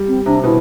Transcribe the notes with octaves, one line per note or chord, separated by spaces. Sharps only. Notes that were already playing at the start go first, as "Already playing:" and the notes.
Already playing: G3
C4
C3 D4
C3
B2 E4